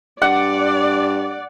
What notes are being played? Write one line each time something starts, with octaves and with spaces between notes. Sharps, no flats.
G2 D5 F#5